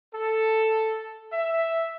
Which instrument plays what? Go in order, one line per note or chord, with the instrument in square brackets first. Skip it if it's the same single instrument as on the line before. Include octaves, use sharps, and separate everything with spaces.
[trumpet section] A4
E5